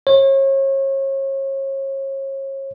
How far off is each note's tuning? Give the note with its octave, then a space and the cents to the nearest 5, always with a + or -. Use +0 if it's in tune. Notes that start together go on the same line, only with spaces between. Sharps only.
C#5 -35